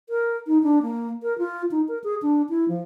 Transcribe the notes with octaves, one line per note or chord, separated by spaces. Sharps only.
A#4
D#4
D4
A#3
A#4
F4
D#4
A#4
G#4
D4
E4
F3